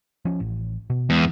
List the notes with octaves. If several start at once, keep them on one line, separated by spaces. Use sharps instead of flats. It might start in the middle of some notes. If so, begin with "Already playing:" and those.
F3 C#4
A1
B2
E2 G#3